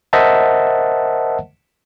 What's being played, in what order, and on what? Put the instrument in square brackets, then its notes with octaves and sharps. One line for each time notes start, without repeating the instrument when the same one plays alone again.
[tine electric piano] A#4 C5 D#5 E5 F#5 A5